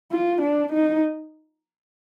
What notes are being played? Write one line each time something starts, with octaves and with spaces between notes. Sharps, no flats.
F4
D4
D#4